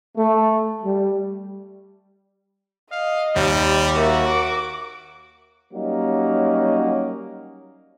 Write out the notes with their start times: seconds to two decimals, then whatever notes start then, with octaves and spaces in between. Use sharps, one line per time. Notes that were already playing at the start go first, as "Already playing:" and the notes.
0.17 A3
0.84 G3
2.92 D#5 F5
3.36 D#2 G3
3.95 A#3 F#4 E5
4.27 D6
5.73 F#3 G3 A#3 C#4 D#4